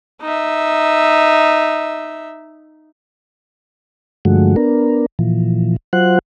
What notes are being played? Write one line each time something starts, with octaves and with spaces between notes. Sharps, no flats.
D#4 E5
G2 D3 F3 G#3 A3 F#4
B3 D4 A#4
A#2 E3 F3
F#3 F4 C5 F#5 F#6